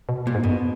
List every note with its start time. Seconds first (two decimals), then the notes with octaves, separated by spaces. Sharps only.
0.09 B2
0.27 A#2
0.35 G#2
0.43 F#2 B2